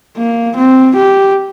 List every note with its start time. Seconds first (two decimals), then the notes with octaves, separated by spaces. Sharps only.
0.17 A#3
0.56 C4
0.96 G4